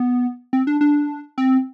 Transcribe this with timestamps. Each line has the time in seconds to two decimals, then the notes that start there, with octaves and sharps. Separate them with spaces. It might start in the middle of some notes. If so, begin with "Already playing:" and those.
Already playing: B3
0.53 C4
0.67 D4
0.81 D4
1.38 C4